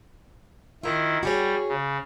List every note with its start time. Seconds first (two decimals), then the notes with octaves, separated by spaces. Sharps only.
0.83 D#3 E4 F4 A#4
1.23 G3 F#4 G#4 C#5
1.69 C#3